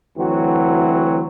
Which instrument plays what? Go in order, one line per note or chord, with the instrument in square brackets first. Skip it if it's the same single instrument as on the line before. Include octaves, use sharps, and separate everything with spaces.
[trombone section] D2 E3 F#3 C4 F#4